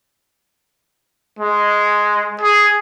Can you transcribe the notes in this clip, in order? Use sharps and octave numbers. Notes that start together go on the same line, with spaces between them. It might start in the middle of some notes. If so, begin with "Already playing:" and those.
G#3
G#4